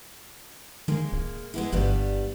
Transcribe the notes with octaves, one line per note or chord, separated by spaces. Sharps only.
D#3 G#3 A#3
D1
G#3 B3 E4
G1 G2 G3 B3